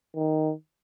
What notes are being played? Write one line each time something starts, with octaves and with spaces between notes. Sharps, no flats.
D#3